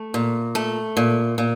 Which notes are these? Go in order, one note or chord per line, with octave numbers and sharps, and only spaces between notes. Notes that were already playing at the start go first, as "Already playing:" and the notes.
Already playing: A3
A#2
A3
A#2
A#2